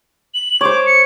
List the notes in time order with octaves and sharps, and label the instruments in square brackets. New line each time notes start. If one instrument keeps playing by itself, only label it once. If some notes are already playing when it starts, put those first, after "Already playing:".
[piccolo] F#7
[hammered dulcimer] C5 C#5 [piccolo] D6
[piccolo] C#7